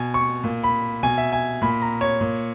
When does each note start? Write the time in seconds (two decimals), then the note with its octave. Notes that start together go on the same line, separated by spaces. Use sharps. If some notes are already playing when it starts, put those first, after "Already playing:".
Already playing: B2 G#5
0.14 C#6
0.44 A#2
0.64 B5
1.03 B2 G#5
1.18 E5
1.33 G#5
1.62 A#2 B5
1.82 A#5
2.01 C#5
2.21 A#2